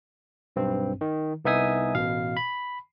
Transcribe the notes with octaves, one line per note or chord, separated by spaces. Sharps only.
B1 G2 C4
D#3
C2 B3 D#4 E5 G#5 D#6
A1 B2 F5
B5